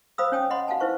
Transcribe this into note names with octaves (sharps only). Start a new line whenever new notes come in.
C5 F5 B5 D#6 E6
C#4 C#5 G5 G#5 D#6
D#5 F#5 B5 C6
F#4 F5 F#5 G#5 A5
E4 B4 C5 C#6